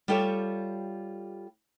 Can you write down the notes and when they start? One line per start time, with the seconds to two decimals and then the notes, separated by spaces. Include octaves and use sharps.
0.08 G3 F4 G4 A4 C#5 E5